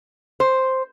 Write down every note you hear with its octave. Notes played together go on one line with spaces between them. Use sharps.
C5